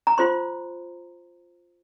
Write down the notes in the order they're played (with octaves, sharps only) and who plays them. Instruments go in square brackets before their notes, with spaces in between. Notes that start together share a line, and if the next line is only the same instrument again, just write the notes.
[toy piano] A#5
F4 C5 C6